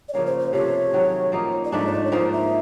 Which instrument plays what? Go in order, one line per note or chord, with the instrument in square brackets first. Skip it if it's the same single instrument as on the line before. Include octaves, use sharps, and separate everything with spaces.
[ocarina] D5
[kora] C#3 F3 A#3 C#4 [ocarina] C#5
[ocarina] C5
C5
[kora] C3 F3 A3 [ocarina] C#5
[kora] D#3 F#3 A3 C#4
F3 A#3 D#4
[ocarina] D5
[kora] G#2 F3 A3 D4 [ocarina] D#5
[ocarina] C#5
D5
C#5
[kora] G#2 F3 A#3 D#4 [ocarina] C5
[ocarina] E5